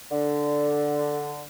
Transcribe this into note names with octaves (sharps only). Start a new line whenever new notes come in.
D3